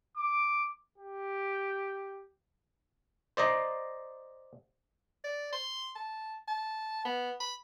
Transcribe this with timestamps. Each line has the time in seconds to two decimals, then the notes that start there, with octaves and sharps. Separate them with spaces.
0.17 D6
0.98 G4
3.37 C5 D5 D#5 A#5
5.24 D5
5.53 C6
5.96 A5
6.48 A5
7.05 B3
7.40 B5